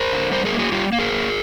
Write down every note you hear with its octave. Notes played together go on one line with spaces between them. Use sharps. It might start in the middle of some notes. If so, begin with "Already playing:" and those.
Already playing: A#4 C5
D3
G3 A#4 C5
G#4 A#4
A#3
F#4 G#4
G3 F4 G4
A#3
G#4 A#4
A#3